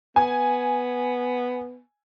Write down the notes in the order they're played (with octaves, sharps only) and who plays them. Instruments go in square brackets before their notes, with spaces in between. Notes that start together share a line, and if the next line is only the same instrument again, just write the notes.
[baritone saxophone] B3 [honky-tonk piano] G#5